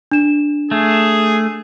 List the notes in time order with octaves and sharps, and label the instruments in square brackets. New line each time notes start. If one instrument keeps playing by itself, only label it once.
[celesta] D4 E7
[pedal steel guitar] A3 [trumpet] G#4